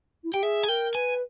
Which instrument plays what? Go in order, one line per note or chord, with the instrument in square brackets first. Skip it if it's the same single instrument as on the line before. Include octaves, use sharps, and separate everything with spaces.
[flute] E4
[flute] G4 [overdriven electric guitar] G5
[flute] G#4 [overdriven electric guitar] E5
[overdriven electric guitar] G#5
[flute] A#4 [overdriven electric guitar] G5
[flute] B4 [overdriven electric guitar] G#5